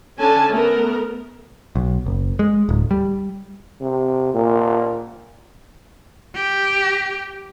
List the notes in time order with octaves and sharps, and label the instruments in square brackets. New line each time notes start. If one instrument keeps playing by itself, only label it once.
[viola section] D3 C#4 G#5 A5
A3 B3 A#4
[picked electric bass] B1
F#1
G#3
D1
G3
[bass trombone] C3
A#2
[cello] G4